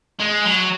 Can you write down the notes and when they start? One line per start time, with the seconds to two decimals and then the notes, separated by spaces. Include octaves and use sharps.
0.20 G#3
0.45 F#3